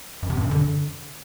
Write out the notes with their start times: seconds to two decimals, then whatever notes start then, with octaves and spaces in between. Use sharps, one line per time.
0.23 F#2
0.30 C3
0.37 G2
0.44 F#2
0.51 D3